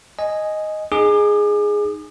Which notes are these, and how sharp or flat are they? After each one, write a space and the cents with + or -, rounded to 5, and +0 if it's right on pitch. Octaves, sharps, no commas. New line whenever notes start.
D#5 +0 G#5 +0
D#4 -10 G#4 +0 D6 +40